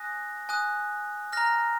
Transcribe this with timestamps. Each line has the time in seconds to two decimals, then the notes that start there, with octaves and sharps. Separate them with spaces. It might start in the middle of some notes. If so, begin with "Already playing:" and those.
Already playing: G#5 D#6 F#6 A#6
0.49 G#5 D#6 F#6
1.33 A#5 F6 A#6